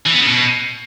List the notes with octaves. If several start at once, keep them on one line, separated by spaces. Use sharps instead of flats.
E3
B3
C#3
B2